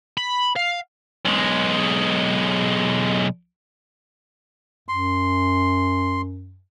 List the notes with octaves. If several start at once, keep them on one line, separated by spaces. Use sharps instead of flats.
B5
F5
B1 G#3
F#2 C6